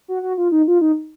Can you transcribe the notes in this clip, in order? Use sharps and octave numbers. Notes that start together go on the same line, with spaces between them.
F#4
F#4
F4
D#4
F4
D#4